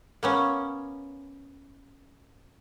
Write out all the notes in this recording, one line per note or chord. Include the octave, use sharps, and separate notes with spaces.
A#3 B3 C#4